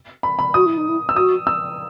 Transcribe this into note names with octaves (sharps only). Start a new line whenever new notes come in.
B5
B5
F#4 D#6
E4
D#4
E4
E6
F#4 D#6
E6